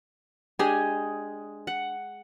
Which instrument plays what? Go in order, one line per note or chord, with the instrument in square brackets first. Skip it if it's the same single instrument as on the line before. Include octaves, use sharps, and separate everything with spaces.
[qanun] G#3 D#5 G#5 [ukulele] D4 G4
[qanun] F#5